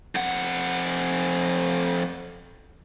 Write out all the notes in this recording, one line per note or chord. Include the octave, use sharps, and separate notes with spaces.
F2 F#5